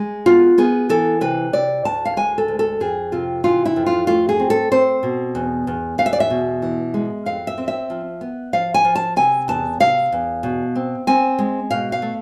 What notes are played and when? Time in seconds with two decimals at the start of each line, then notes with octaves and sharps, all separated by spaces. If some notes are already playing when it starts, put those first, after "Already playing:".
Already playing: G#3
0.26 B3 F4
0.58 B3 G#4
0.89 E3 A4
1.21 C3 B4
1.53 C3 D5
1.85 D2 A5
2.05 F5
2.17 G#3 G#5
2.38 A4
2.48 D2
2.59 A4
2.80 F2 G#4
3.12 C3 F4
3.44 E3 F4
3.65 E4
3.76 F2
3.86 F4
4.07 A3 F4
4.29 G#4
4.40 C4
4.50 A4
4.72 C4 C5
5.03 B2
5.35 E2
5.67 E2
5.98 E2 F5
6.06 E5
6.13 D5
6.20 E5
6.30 B2
6.62 E3
6.94 G#3
7.26 F2 F5
7.47 E5
7.58 C4
7.68 E5
7.90 F3
8.21 B3
8.53 F3 F5
8.74 G#5
8.85 F3
8.95 A5
9.16 C3 G#5
9.48 E2 A5
9.80 C3 F5
10.12 E2
10.43 B2
10.75 C4
11.07 C4 G#5
11.39 G#3
11.71 B2 F5
11.92 F5
12.02 A3